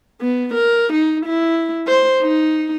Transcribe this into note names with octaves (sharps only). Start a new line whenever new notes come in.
B3
A#4
D#4
E4
C5
D#4